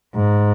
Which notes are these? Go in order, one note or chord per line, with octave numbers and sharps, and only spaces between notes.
G#2